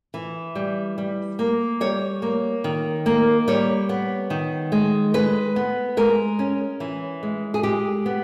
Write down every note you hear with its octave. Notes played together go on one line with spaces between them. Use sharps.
E3
G3
G3
A#3
G3 C#5
A#3
D#3
A#3
G3 C#5
B3
D#3
G#3
G#3 B4
B3
G#3 A#4
C#4
E3
G#3
G#4
G#3 G4
B3